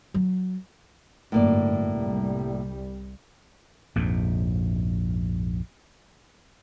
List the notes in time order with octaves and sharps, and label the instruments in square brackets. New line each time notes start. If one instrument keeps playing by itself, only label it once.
[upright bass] F#3
[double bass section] G1 F#2 [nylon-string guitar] A2 A#3 D5
[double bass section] C2 G3
[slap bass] A#1 F2 G#2